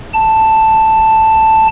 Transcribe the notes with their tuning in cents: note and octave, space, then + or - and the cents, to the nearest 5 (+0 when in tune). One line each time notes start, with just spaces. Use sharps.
A5 +5